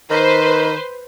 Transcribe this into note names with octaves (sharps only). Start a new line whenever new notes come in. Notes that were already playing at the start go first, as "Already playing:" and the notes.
D#3 B4 C5